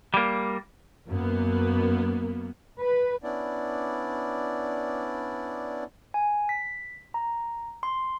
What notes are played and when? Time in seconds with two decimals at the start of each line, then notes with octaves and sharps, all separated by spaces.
0.14 G3 A#3
1.07 F#2 A#3 B3
2.80 B4
3.23 B3 C#4 D4 E4 D5
6.14 G#5
6.49 B6
7.14 A#5
7.83 C6